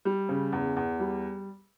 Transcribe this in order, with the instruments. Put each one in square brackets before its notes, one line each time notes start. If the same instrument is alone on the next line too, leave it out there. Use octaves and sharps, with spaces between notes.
[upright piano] G3
C#3
E2
E2
G3